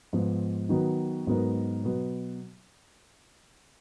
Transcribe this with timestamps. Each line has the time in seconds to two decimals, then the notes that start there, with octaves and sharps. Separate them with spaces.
0.13 G#2 F3 B3
0.69 D#3 F#3 B3 D#4 F#4
1.27 G#2 F#3 B3 D#4 A#4
1.84 B2 F#3 B3